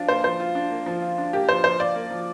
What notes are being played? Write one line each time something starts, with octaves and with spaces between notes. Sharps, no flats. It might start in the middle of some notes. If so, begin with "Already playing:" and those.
Already playing: F3 D4 F4
A#3 C5
F3 C5
F4
D4
A#3
F3
F4
D4
A#3 G4
F3 C5
F3 C5
F4 D5
A#3
F3